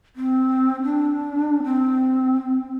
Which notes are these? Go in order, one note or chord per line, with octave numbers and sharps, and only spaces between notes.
C4
D4
C4